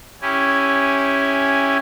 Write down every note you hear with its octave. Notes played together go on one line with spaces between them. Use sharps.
C#4 E4 G4 G#5